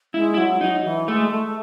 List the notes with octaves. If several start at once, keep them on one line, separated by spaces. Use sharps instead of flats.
G#3 E4
E4
F#3
F#3 D#4
E3
G#3 A3
A3